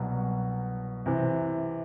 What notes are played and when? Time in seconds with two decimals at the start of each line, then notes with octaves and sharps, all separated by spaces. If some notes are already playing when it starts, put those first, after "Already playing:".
Already playing: C2 B2 F#3
1.06 C3 E3